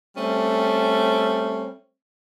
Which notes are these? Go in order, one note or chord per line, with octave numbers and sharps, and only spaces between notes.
G3 A3 C4 C#4